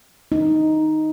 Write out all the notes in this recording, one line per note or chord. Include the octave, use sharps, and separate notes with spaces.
D#4